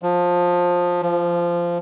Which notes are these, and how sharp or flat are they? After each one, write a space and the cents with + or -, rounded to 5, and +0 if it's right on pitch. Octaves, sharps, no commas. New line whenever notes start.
F3 +20
F3 -15